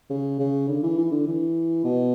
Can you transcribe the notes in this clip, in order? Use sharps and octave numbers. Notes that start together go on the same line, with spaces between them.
C#3
C#3
D3
E3
E3
D3
E3
B2